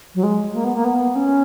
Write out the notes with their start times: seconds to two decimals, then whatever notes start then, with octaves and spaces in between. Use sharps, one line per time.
0.15 F#3
0.23 G#3
0.54 A#3
0.64 B3
0.75 A#3
0.85 B3
1.16 C#4